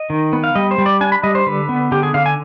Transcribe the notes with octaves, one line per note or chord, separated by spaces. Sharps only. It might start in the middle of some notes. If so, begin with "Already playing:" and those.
Already playing: D#5
D#3
B3
F5
G3 D#5
C5
G3
D5
D4 G#5
B5
G3 D#5
C5
D3 B4
B3
D3 G4
G#4
D3 F5
G#5